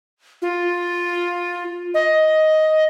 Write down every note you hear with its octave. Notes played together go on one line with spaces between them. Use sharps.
F4
D#5